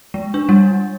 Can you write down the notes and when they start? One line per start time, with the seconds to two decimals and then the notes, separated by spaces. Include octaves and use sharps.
0.14 G#3
0.34 D4
0.49 G3